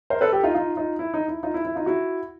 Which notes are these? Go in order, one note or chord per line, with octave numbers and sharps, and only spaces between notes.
A#4 C5
A4 B4
G4 A4
D#4 F4
D#4 F4
D#4 F4
E4
D#4
E4
D#4 F4
E4
E4
D#4 F4
E4 F#4